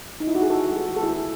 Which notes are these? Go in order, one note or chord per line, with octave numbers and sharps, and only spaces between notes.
D#4
E4
F#4
G#4
D#3 F#4 A4
G#3
F#4 A4
D#3
A4
E4 G#4
B3